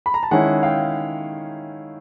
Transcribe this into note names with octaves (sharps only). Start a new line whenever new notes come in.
B5
A#5
A5
D#3 G#3 C#4 E4 F#5 G#5
F5 G5